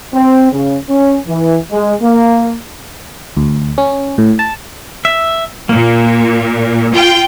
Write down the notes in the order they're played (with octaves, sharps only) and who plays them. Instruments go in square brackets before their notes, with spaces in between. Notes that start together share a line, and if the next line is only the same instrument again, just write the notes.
[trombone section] C4
C#3
C#4
E3
G#3
A#3
[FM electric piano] D2
C#4
A2
A5
[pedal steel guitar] E5
[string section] A#2 [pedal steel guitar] A#3
[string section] F4 G5